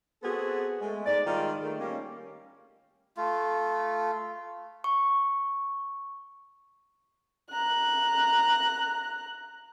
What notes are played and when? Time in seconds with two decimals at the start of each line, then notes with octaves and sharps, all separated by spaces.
0.23 B3 C4 F#4 G#4 A4
0.82 G#3 A3
1.06 G#2 D5
1.27 D#3 G3 G#3 F4
1.62 D#3 A3
1.80 G3 A#3 C#4
3.17 A3 F4
4.84 C#6
7.51 A#5 F#6